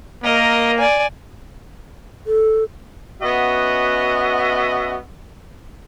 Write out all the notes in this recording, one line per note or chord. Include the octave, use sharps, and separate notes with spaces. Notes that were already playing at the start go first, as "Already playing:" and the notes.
A#3 A#4 D#5
D5 G#5
A4
B3 C#4 F#4 D#5 E5 F#5